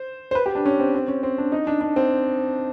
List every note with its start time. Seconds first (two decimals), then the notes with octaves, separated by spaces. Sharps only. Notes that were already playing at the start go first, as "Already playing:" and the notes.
Already playing: C5
0.31 C5
0.35 B4
0.46 G4
0.55 D4
0.65 C#4
0.80 C4
0.95 C4
1.08 C#4
1.23 C4
1.38 D4
1.52 D#4
1.67 D4
1.81 D4
1.96 C4